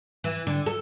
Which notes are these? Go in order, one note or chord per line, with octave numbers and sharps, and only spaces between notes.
E3
D3
A4